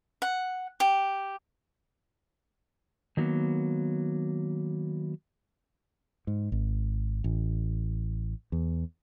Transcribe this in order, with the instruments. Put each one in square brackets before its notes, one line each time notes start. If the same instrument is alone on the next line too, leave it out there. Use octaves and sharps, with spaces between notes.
[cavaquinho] F#5
G4
[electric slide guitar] D#3 F#3 A#3 B3
[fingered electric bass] G#2
G#1
A1
E2